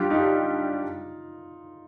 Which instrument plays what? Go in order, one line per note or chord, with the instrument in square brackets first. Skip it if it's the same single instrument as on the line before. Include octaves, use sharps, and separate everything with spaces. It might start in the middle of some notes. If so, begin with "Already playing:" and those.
Already playing: [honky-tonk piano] G3 D4 G4 [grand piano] F4
[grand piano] D#4
F4